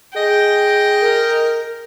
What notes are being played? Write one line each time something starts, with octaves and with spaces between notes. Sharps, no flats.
G#4 D#5 G5
A#4